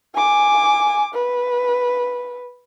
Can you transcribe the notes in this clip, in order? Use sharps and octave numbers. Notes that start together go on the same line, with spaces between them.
G#5 D6
B4